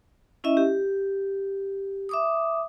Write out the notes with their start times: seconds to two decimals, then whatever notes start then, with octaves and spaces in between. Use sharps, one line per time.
0.44 C#4 E4 D#5 E5
0.57 G4
2.09 E5 D6 D#6